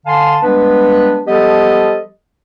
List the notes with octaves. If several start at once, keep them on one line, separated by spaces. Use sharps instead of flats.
D3 F5 G#5 A5 C6
G3 G#3 B3 D4 B4
F3 G3 B3 G4 A4 D#5